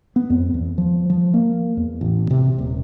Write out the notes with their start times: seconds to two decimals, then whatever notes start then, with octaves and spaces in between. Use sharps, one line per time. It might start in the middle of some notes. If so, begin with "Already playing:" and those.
0.16 B3
0.30 F2
0.54 E2
0.78 F3
1.10 F3
1.34 A#3
1.77 E2
2.01 A1
2.31 C3
2.58 D#1